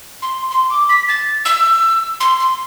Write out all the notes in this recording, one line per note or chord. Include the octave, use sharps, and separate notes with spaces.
C6
C6
D6
B6
A6
E6
C6
C6